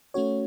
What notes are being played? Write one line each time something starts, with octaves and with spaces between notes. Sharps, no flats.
A3 C#4 F#4 C#5